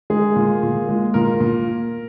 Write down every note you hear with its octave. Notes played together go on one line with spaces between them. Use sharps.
G#3 G#4
A#2
A#2
G#3
A#2 A#4
A#2